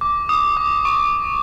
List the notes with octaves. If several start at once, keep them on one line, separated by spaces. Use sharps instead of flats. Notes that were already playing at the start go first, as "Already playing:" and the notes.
D6
D#6
D6
C#6